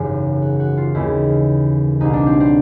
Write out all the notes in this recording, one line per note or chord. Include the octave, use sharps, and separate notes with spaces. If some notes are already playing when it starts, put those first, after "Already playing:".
Already playing: G#1 F#2 C#3 E3 G4
F#4
F#4
F4
D#2 C#3 E3 E4
C2 B2 D#4
D4
C4
C4